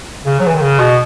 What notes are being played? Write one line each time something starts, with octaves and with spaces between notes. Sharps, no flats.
C#3
F#3
E3
D#3
C#3
B2